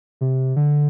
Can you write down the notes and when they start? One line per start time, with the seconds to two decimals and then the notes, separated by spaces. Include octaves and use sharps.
0.21 C3
0.56 D3